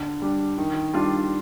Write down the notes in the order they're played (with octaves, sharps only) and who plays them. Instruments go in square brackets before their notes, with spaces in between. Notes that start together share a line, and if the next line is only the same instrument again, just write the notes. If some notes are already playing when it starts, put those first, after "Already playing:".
Already playing: [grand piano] D3
G3 D4
D#3
G3 D4 F4